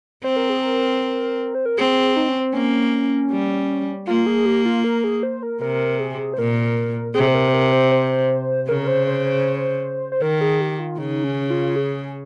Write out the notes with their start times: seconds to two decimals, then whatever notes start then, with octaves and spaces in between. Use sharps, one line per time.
0.24 C4 C5
0.36 A#4
0.50 G#4
0.63 A#4
1.55 C5
1.65 A#4
1.78 C4 G#4
2.16 D#4
2.29 C#4
2.40 C4
2.53 A#3 C#4
3.32 G3
4.07 A#3 F4
4.27 G#4
4.46 G4
4.65 F4
4.84 A#4
5.04 G#4
5.23 C5
5.43 A#4
5.61 C3 A#4
5.99 G#4
6.34 C5
6.38 A#2 A#4
7.15 C3 G#4
7.27 C5
7.34 A#4
7.49 C5
7.53 A#4
7.73 C5
7.92 C5
8.68 C#3 A#4
8.87 C5
9.07 C5
9.26 C5
10.12 C5
10.22 D#3 A#4
10.41 G#4
10.61 G4
10.79 F4
10.98 C#3 D#4
11.24 C#4
11.50 F4
11.76 G#4